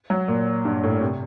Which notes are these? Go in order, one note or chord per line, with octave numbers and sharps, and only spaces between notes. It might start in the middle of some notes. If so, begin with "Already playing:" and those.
F#3
A#2
G2
A2
C3